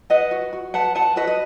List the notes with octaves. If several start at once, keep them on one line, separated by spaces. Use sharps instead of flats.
B4 D#5 F#5
F#4
F#4
B4 F#5 A5
B4 F#5 A5
F#4 B4 D#5
D#5